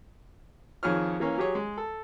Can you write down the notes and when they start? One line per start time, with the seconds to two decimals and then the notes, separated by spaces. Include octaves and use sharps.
0.83 F2 D#3 G#4 C#5 F6
1.20 E3 A#3 C#4
1.38 F#3 G4 G#4 C#5
1.55 G#3
1.78 A4